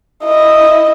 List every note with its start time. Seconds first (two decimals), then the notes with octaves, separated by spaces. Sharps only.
0.24 E4 D#5